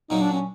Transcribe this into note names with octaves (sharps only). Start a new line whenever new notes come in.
A#2 F#3 A#3 D#4
D4
C#4